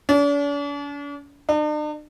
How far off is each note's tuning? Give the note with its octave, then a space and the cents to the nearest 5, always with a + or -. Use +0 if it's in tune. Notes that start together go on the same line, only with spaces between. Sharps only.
D4 -45
D4 +45